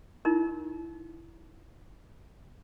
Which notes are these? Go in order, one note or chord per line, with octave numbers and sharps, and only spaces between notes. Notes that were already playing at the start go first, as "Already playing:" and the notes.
D#4 E4 A#4